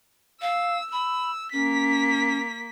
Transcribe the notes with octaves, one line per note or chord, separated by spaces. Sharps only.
F5 E6
B5 E6
A#3 C#4 B6